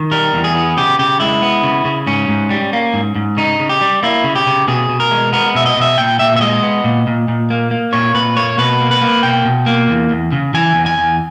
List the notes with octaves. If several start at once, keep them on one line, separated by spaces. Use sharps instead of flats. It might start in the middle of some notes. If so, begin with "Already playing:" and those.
Already playing: D#3
G3 A#4
E2
G#4
B3
C#3 G4
C#3 G4
G#3 E4
B3
C#3
C#3
G#2 C#4
G#2
G3
A#3
G#2
G#2
C#3 D#4
C#3
G4
G3
A#3 E4
C#3
G4
C#3
B2 G#4
B2
A#4
G#3
B3 A#4
B2 E5
D#5
B2 E5
A#2 G5
A#2 E5
E5
G#3 D#5
B3
A#2
A#2
A#2
A#3
A#3
A#2 C#5
A#2 B4
A#3 C#5
B2 B4
A#3
B4
A#3
B2 G5
B2
A#3
E2
E2
C#3
E3 G#5
E2
G#5
E2